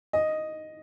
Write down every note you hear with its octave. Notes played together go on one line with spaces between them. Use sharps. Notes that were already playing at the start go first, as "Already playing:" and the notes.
D#5